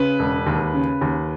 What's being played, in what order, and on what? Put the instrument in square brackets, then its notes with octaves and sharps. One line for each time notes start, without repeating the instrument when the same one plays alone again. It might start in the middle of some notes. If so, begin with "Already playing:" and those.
Already playing: [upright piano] C#3 [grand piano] B4
[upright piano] E1
D#2
C#3
D#2